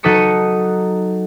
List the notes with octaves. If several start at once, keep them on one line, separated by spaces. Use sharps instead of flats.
F#3 D#4 A4 D#6 B6 C#7